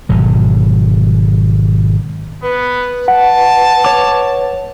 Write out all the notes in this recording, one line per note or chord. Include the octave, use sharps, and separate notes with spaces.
G#1 B2 F#3
B3 B4
F#5 A5
C#5 D6